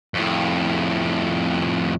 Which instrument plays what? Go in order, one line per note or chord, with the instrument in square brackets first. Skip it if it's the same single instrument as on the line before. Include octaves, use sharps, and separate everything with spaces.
[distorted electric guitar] F2 A2